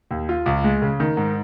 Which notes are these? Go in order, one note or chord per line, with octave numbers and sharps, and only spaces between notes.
D#2
F4
C#2
G#3
C#3
D#3
G#2